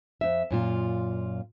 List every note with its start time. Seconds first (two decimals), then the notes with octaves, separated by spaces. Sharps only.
0.21 F2 E5
0.51 F#2 A#2 F4